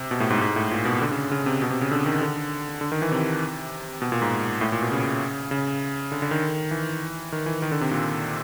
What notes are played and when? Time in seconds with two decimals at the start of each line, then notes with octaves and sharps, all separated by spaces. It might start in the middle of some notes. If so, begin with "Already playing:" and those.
Already playing: C3
0.11 B2
0.20 A2
0.30 G#2
0.41 G#2
0.56 A2
0.71 A#2
0.85 B2
1.02 D3
1.11 C#3
1.31 C#3
1.46 C3
1.62 B2
1.70 C3
1.81 C#3
1.91 D3
2.06 D#3
2.22 D3
2.81 D3
2.92 D#3
3.02 E3
3.12 C3
4.02 B2
4.12 A#2
4.22 G#2
4.61 A2
4.72 A#2
4.82 B2
4.92 C#3
5.51 C#3
6.12 D3
6.22 D3
6.31 D#3
6.71 E3
7.32 D#3
7.46 E3
7.62 D#3
7.72 D3
7.81 C3
7.91 A#2